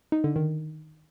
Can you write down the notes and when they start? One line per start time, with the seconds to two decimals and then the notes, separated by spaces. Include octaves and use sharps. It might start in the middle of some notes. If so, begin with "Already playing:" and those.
0.12 D#4
0.24 D3
0.36 D#3